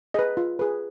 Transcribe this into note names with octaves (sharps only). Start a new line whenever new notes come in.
G#4 B4 D#5
F4
G#4 B4